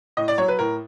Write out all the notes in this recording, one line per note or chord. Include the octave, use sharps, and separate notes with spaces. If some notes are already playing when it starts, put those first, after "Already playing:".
A2 D#5
D5
F#3 C#5
B4
A2 A#4